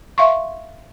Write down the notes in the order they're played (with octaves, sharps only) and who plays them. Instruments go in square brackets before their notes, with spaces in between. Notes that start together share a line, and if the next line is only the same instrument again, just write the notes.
[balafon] E5 F5 C6 C#6